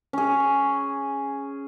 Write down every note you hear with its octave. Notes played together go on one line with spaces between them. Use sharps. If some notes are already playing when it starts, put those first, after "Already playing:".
C#4 G#4